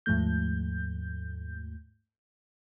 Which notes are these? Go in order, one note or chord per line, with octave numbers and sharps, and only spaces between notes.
D#2 G#2 F3 A3 G6